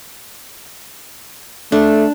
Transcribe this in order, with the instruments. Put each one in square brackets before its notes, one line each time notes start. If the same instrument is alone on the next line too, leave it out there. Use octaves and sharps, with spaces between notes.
[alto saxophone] A3 [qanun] D4